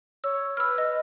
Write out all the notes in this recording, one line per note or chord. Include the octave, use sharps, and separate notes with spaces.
C#5 E6
B4 E6 F6
D#5